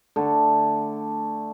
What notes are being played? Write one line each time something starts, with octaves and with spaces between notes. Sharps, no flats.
D3 A3